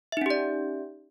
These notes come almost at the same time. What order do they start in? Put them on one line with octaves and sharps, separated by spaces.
E5 D#4 C#4 G4 D5